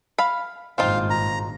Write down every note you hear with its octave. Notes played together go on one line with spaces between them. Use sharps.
F5 B5
G#1 G2 A#2 C4 D#4 F4 F5
A#5